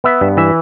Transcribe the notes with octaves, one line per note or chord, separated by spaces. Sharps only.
B3 E5
G2
E3 E5